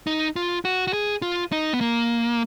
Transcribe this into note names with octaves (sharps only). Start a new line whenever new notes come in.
D#4
F4
F#4
F#4
G#4
F4
D#4
B3
A#3